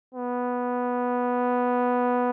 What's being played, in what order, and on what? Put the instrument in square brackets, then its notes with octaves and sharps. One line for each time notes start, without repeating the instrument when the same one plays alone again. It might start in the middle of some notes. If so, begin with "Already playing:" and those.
[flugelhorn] B3